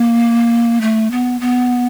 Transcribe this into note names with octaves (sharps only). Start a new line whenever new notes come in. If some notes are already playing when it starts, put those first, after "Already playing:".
Already playing: A#3
A3
B3
B3